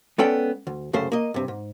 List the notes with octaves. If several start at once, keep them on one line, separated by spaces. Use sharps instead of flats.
G#3 B3 C#4 A4 D5 G5
D2
C2 F#2 C#3 A3 C5
A#3 D#5
G2 C3
G#2